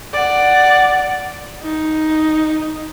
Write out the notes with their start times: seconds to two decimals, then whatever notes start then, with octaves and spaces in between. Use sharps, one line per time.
0.13 D5 F#5
1.62 D#4